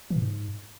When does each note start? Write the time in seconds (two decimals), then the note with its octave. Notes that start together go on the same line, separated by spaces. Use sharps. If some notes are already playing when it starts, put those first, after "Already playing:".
0.10 E3
0.16 A2
0.22 G#2